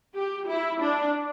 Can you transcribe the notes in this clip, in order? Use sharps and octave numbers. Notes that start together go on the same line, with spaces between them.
G4
E4
D4